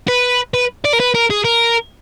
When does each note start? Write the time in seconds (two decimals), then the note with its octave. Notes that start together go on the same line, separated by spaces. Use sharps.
0.08 B4
0.54 B4
0.85 D5
0.93 A#4
1.00 B4
1.15 A#4
1.30 G#4
1.45 A#4